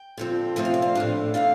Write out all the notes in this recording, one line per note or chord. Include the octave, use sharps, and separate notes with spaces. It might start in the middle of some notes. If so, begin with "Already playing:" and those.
Already playing: G5
D3 F3 C4
C3 F3 A3 C4 G5
F5
D5
F5
A2 A3 D4
C3 A3 D4 F5